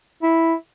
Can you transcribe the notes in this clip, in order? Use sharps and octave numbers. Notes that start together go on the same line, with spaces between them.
E4